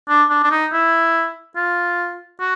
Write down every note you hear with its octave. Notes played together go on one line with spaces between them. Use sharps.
D4
D4
D4
D#4
E4
F4
F#4